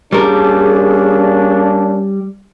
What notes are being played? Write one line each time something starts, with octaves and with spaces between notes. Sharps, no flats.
G3 A#3 C#4 D4 G#4 A#4